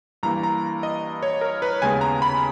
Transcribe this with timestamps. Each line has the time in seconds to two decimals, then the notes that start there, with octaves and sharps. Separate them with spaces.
0.23 G2 E3 A#3 A#5
0.43 A#5
0.83 D#5
1.23 C#5
1.41 A#4
1.62 B4
1.82 D#2 C#3 G#3 B3 G#5
2.01 A#5
2.22 B5